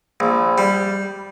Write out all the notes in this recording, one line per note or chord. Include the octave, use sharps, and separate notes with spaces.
A#1
G3